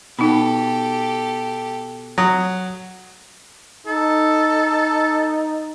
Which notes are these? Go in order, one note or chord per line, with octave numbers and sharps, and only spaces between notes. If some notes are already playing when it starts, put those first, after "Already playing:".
B2 D#4 G4 A4 B5
F#3 D#6
D#4 A4